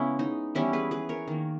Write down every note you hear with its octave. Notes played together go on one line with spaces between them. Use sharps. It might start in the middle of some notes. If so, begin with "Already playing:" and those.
Already playing: C#3 G#3 B3 C#4 E4
D#4
E3 G3 B3 C#4 E4
G#4 B4
G#4 B4
A#4 C#5
D#3 A#3